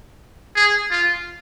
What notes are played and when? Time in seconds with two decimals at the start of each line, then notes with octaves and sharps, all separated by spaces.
0.56 G#4
0.91 F4